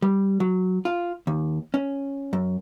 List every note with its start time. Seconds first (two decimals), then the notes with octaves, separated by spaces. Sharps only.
0.02 G3
0.40 F#3
0.85 F4
1.27 D#2
1.74 C#4
2.33 F#2